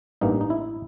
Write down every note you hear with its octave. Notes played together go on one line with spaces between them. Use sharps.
A1 G2 E3 G3 A#3 D#4
D#4
E4